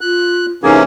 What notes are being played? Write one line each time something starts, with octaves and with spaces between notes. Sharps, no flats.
F4 F#6
C3 E3 A#3 C#4 D#4 G#4